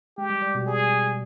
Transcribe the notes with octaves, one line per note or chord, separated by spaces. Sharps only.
G#3 G4
G3
G3
B2
G3 G#4